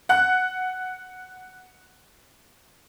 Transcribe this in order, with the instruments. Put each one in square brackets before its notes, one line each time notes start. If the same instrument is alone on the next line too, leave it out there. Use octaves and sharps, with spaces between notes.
[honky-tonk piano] F#5 F#6